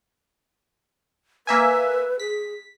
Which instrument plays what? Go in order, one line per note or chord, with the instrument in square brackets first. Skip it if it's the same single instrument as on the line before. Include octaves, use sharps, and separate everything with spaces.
[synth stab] A#3 E5 G#5 [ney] B4
[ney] G#4 [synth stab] B6